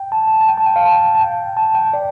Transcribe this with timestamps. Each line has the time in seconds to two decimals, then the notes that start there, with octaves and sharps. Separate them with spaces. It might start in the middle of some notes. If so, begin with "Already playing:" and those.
Already playing: G5
0.12 A5
0.27 A5
0.41 A5
0.48 G5
0.57 A5
0.66 G5
0.76 F5
0.85 A5
1.15 A5
1.21 G5
1.57 A5
1.75 G5
1.93 D5